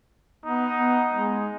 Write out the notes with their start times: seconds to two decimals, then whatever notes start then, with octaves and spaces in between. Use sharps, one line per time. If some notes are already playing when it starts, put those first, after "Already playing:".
0.45 B3 D#4
0.76 B3
1.13 G#3